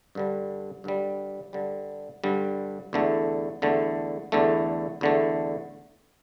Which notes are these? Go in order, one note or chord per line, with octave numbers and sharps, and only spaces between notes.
G2 D3 G3
G2 D3 G3
G2 D3 G3
G2 D3 G3
E2 D3 A3
E2 D3 A3
E2 D3 A3
E2 D3 A3